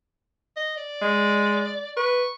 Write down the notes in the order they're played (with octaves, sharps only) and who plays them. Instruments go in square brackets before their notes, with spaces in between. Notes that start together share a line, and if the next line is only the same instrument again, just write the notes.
[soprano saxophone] D#5
D5
[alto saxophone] G#3
[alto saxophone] B4 [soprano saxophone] C#6